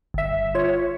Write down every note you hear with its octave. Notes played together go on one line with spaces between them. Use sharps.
G1 E5
F4 C#5